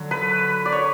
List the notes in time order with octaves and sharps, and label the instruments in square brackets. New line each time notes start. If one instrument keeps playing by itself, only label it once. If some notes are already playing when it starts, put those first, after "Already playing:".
Already playing: [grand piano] D3 F#3
[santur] B4
D5
C#5